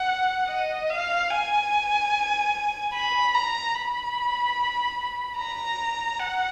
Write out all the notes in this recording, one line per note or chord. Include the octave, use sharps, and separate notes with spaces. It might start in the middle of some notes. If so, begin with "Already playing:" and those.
Already playing: F#5
D#5
F5
G#5
B5
A#5
B5
A#5
F#5